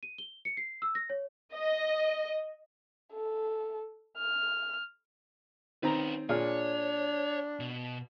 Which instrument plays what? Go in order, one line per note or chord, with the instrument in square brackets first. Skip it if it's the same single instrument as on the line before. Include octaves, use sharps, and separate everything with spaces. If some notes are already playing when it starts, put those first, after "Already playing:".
[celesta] D#7
G7
C#7
C7
E6
A#6
C#5
[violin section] D#5
[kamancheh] A4
F6
[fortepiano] D#3 C4 A#5 [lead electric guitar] C#4 B4
[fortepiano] A#2 G#4 F6 [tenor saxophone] D4 [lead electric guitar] C#5
[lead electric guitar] B2